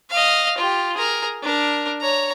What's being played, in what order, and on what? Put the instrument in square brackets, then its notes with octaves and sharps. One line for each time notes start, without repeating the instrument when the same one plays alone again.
[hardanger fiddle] D#5 F5
F4 G4
G#4 A#4
D4 A#4
C#5 A#5